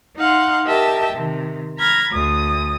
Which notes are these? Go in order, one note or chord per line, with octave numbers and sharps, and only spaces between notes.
D#4 F5 F#5 C6
G4 A#4 D#5 E5 G5 A5
C3 D#3
A#5 B5 F6 G#6 A#6
D2 D#6